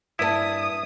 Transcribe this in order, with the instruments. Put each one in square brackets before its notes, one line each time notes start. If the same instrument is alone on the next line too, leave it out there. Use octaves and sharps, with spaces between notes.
[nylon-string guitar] G2 B4 A5 [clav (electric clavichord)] E4 [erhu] D#6